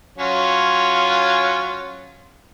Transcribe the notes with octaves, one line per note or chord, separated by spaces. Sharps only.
F#3 C#4 F4